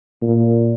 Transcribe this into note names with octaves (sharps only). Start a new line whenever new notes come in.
A#2